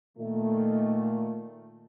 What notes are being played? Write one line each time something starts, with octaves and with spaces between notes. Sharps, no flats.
A#2 D#3 A3